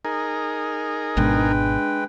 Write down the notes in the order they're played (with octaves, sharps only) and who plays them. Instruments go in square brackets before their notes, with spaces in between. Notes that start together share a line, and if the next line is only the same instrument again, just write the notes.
[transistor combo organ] D#4 G#4 A#4
[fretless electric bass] G#1 G#2 B2 [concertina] G#3 B4 G5 [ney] D4